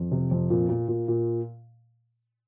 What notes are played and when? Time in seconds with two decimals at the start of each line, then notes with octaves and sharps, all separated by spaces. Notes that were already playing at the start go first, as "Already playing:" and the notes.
Already playing: F2
0.12 C3
0.31 F2
0.50 A#2
0.69 A#2
0.88 A#2
1.08 A#2